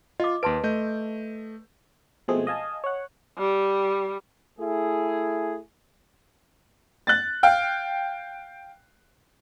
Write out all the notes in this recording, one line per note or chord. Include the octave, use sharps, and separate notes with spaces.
F4 D#5 D6
D#2 B4 A5 C6 D7
A3 D#5 G6
B2 F3 G#3 A3 C4 G#4
D#5 F5 G#5 A5
C#5 F#5
G3
A3 E4 G#4
F#6 A6
F5 G5